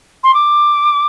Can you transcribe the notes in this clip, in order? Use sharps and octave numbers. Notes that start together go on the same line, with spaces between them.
C6
D6